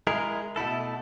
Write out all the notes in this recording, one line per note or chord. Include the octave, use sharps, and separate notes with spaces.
G#3 E4 G#4 A#4
B2 A3 E4 A4